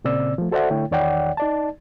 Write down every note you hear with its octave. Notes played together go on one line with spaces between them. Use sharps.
A#2 C#3 C4 D5 E6
F3 A3
F#4 A4 C5 D5 E5 F#5
D3 A3 E4 C#5 G5
E2 D#3 C#5 D5 F#5 G5
D#4 D5 A5